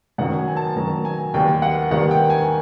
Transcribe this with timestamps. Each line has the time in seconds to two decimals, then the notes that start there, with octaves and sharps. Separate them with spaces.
0.18 F#2 D#3 F#3 F#5
0.37 G#5
0.48 G#5
0.57 A5
0.76 F#2 D#3 F#3 A#5
1.05 G#5
1.34 D#2 D#3 G3 G5
1.62 F#5
1.91 D#2 D#3 G3 F#5
2.11 G5
2.30 G#5